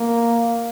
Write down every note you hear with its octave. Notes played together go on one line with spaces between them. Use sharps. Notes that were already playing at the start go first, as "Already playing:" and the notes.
Already playing: A#3